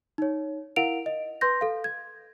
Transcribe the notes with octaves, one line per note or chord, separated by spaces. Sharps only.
D#4 C#5
E4 A#4 F5 F#5 D7 F7
D#5
B4 C6 G6 A#6
A4 F5
G#6